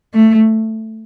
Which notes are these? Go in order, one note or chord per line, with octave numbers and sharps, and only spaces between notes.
A3